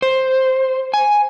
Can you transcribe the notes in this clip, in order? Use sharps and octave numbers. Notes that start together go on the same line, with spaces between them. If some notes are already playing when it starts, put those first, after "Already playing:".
C5
G#5